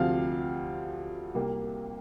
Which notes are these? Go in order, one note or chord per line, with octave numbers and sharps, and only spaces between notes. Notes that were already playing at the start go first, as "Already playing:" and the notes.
Already playing: D2 C3 F3 C4 F5 F6
C2 C3 A#3